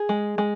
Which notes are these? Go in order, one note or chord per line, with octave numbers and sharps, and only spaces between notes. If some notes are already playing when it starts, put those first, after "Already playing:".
Already playing: G#4
G#3
G#3